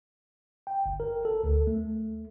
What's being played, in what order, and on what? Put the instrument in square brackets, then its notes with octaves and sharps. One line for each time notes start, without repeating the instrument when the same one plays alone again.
[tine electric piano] G5
G1
A#4
A4
D2
A3